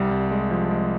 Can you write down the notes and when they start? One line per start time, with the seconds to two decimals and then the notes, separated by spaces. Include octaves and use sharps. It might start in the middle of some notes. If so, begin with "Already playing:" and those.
Already playing: C2 G3
0.11 C2
0.31 G#3
0.51 F3
0.71 G#3